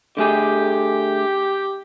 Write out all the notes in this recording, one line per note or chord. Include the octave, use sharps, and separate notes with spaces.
D3 A3 G4 G#4